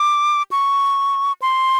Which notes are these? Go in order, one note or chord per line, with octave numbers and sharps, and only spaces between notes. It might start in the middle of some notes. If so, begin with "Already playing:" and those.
Already playing: D6
C#6
C6